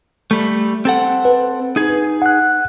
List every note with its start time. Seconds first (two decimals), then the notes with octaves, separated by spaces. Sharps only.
0.31 G3 A3
0.85 C4 A4 F#5
1.25 B4
1.76 D#4 G#4
2.22 F#5 F#6